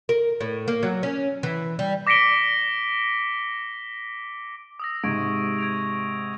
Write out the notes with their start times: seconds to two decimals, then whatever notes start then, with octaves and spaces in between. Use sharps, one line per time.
0.09 A#4
0.41 A2
0.68 A#3
0.83 F#3
1.03 C#4
1.43 E3
1.79 G3
2.07 D6 A#6 B6 C#7 D7 G7
4.80 D#6 E6 A#6
5.04 G#2 C3 C#6 G#6 D7
5.58 G#6 D7 F7